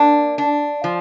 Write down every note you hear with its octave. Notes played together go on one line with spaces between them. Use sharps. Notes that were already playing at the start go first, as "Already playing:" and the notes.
Already playing: A#3 D4
D4
F3